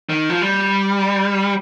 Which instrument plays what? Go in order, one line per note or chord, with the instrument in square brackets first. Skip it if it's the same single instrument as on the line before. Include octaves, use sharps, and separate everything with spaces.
[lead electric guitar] D#3
F3
G3